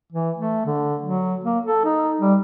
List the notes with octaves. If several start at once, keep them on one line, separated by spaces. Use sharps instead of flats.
E3
A3
D3
F#3
A#3
A4
D#4
G3